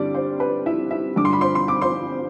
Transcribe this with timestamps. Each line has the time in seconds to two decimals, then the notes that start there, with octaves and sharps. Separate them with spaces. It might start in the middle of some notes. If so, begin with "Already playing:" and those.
Already playing: G2 D3 G3 C4 D4 E4 D5
0.14 C5
0.40 B4
0.66 E4 E5
0.91 E4 E5
1.16 G2 D3 G3 D4 D6
1.25 C6
1.33 B5
1.41 C5 C6
1.55 C6
1.68 D6
1.82 C5 C6